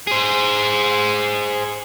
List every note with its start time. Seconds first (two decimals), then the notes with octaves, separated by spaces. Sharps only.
0.07 G#4 C5